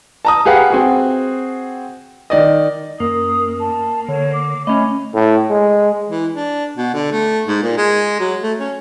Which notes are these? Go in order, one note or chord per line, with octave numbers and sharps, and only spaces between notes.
A5 A#5 D#6
G4 G#4 B4 F5 F#5
C4 F#4 G#4
D#3 D5 D#5
F#2 A#3 D#6
A5
D3 C#5
D6
A3 C#4 D#5 B5
A2
G#3
E3
D4
B2
D3
A3
G#2
A#2
G#3
F#3
A3
C#4